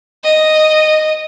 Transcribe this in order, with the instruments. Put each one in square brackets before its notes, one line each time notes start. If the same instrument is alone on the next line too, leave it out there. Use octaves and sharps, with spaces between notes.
[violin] D#5